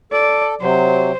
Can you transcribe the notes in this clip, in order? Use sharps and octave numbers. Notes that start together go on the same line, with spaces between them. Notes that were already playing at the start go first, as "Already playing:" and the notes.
A4 D5
C3 F#3 C5